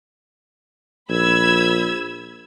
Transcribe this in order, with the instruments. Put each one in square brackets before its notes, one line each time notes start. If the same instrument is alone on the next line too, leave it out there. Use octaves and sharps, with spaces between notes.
[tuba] A#1 [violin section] B5 E6 G#6